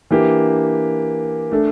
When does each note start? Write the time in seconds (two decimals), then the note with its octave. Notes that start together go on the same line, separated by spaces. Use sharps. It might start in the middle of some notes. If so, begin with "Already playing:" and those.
0.10 E3 A#3 D4 G4
1.51 A3 D4 A4